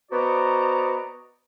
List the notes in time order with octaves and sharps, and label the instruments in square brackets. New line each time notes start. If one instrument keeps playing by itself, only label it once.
[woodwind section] B3 F#4 C5 D5 D#5 A#5